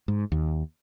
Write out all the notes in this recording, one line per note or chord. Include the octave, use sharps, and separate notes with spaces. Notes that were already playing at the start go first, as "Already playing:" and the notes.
G#2
D#2